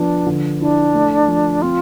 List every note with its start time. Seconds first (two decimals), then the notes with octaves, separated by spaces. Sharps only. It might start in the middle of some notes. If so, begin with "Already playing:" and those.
Already playing: F3 B3 D4
0.26 D3
0.60 D4 E4
0.94 A3
1.28 F3
1.62 C4 F4